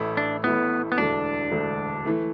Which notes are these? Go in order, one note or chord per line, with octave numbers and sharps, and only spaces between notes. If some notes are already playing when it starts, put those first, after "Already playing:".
Already playing: A1 A2 A3 E4
D4
A1 A2 A3 B3 E4
B3
E1 D2 D3 D4
E1 D2 D3
E3 A3